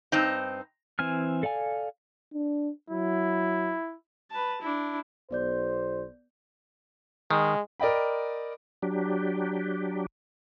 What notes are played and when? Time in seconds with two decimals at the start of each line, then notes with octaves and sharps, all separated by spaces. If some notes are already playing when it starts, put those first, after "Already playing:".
0.12 G2 C4 D#4
0.99 E3 C4 G#5 F6
1.43 A4 D5 F5 G#5
2.33 D4
2.90 F#3 E4
4.31 B4 A5
4.62 D4 E4
5.31 B1 B3 C5 D5 G6
7.31 D#3 G#3
7.80 A#4 D5 D#5 G5 B5
8.82 F#3 D4 G4